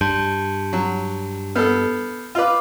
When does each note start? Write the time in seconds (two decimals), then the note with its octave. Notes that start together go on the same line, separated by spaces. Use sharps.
0.01 G2 A5 C6 G6
0.73 F#3
1.56 B3 A4 F6 G6 C7
2.35 F4 B4 D#5 D6